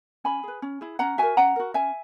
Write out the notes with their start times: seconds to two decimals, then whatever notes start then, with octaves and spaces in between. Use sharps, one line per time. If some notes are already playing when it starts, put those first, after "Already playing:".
0.24 C#4 G#5 B5
0.43 G#4 B4
0.62 C#4
0.81 E4 G#4
0.99 C#4 F#5 A#5
1.18 F#4 A#4 E5 G#5
1.37 C#4 F#5 A#5
1.56 F#4 A#4
1.74 C#4 E5 G#5